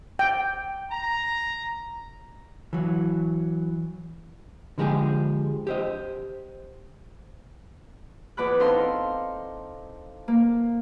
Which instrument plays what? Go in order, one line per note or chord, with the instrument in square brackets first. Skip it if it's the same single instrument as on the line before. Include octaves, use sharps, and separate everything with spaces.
[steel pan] G5
[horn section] A#5
[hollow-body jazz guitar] E3 F#3
D3 F3 G#3 C4 G4 G#4
G4 C5 D#5
[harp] E2 D5 B5 F#6
C4 D#4 A4 F5 C6
A#3